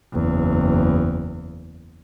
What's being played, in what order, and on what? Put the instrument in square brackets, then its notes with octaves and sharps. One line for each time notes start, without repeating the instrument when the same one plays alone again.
[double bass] F#1 E2